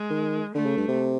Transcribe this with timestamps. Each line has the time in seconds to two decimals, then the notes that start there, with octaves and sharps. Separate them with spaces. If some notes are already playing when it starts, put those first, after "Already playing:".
Already playing: G#3
0.10 D#3
0.55 D3 A3
0.66 C#3
0.77 G2
0.88 C3